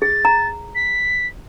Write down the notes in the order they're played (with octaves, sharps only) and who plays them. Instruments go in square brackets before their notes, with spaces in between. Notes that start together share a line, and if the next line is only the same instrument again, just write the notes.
[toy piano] G#4 [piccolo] A6
[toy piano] A#5
[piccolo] B6